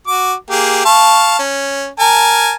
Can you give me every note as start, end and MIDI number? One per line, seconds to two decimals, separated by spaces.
0.07 0.33 66
0.07 0.33 86
0.50 0.83 58
0.50 0.83 67
0.50 0.83 68
0.85 1.38 77
0.85 1.38 81
0.85 1.38 85
1.39 1.87 61
2.00 2.53 70
2.00 2.53 80
2.00 2.53 81